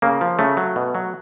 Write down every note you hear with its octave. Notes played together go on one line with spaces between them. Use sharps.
C#3 A#3
F3
C#3 A3
F#3
B2
F#3